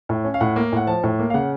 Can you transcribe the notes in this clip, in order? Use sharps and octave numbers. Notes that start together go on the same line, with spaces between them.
A2
C#4
F5
A2 F#5
A#3
A2 F#5
F3 A5
A2
A#3
F5
C#3 F#5